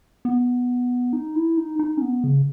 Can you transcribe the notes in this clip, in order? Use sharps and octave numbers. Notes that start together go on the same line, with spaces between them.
B3
D#4
E4
D#4
D#4
C#4
B3
C#3